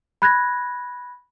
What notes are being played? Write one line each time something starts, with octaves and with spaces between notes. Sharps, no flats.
B5 F#6 G#6 A#6